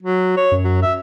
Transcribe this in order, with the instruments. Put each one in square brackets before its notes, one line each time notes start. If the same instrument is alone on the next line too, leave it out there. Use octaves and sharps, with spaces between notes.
[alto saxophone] F#3
C#5
[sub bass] F#2
[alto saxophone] F#3
E5